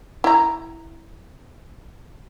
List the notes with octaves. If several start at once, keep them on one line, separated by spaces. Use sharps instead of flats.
E4 A#5